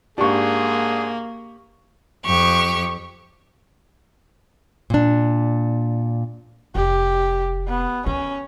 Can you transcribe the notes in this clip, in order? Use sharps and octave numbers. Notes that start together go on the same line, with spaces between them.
G#2 A#3 D4 G4 G#4 C#6
F2 G4 C#6
A#2 D4
F1 G4
B3
D#3 C#4